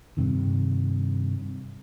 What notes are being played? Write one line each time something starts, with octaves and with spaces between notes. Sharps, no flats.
G2 C3 D#3